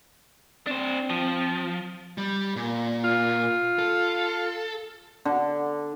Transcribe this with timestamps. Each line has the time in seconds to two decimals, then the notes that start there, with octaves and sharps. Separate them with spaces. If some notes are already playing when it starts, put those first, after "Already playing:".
0.67 C4 D4 C5
1.10 F3
2.18 G3
2.56 A#2
3.04 F4
3.79 A4
5.25 D3